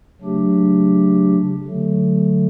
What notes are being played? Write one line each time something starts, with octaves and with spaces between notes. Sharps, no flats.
C#3 F#3 A3 D4 G4
D3 F#3 A3